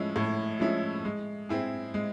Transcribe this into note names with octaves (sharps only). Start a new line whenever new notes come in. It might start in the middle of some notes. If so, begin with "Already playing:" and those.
Already playing: A2 F3 G#3 C#4 E4
A2
F3 G#3 C#4 E4
G#3
C4 E4 G#4
G#3